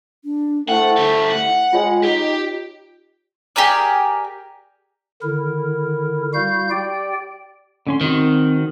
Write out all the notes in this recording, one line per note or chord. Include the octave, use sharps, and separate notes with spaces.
D4
A3 E4 C5 F#5 G5
D3 E4 G4
F#5
G#3 F4 C#5 D#5 G5
D#4 G4
G4 G#4 A#4 D5
D3 D#3 E4 A#4
G3 E4 F#4 F5 G6
G4 D5 G5
D3 C#4 C6
D#3 C4 F#4